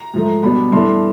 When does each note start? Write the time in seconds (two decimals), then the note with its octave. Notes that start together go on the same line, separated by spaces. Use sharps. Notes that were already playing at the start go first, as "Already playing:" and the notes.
Already playing: A#5
0.14 G#2 F3 A3
0.43 B2 G3 B3 D4 B5
0.72 G2 E3 A3 D4 C6